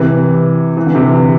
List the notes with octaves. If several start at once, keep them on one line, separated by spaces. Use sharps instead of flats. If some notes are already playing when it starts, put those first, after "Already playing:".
Already playing: C3 E3
E3
D3
C3 E3